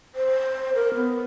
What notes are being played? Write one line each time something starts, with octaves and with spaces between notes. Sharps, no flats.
C5
A#4
B3